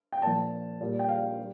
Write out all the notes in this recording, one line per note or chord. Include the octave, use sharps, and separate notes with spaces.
G5
A#2 F3 A5
A#2 G3
G5
F5
G3